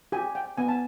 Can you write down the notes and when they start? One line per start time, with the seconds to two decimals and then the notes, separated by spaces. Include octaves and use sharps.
0.12 G4 G#5
0.35 G5
0.57 B3 G#5
0.68 A5